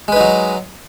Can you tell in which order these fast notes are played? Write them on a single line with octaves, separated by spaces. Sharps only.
G#3 B4 D#4 F#3